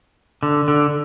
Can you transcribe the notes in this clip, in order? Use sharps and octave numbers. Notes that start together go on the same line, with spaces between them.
D3
D3